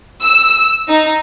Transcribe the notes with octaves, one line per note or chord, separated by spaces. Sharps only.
E6
D#4